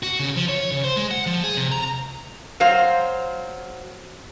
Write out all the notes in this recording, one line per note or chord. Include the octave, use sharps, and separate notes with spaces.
F#4
C#3
F3
C#5
C#3
C5
G#3
F#5
F3
G#4
C3
A#5
F#3 C5 F5